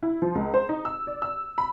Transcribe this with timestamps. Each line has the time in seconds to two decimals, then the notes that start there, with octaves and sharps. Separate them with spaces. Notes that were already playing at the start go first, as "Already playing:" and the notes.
0.03 E4
0.22 F3
0.35 C#2
0.54 C5
0.69 D#4
0.85 E6
1.07 D5
1.22 E6
1.58 B5